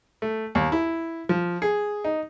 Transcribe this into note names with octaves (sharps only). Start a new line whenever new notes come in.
A3
D#2
E4
F3
G#4
D#4